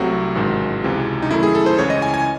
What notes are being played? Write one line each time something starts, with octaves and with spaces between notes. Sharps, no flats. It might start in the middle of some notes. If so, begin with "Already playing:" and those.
Already playing: C2 C3 F#3 A3 F#4
A1 G#2 D#3 G#3
C#2 C3 E3 G#3
D#4
F#2 D#3 A3 E4
G#4
A4
C5
C#2 C#3 E3 C#5
D#5
G#5
G#5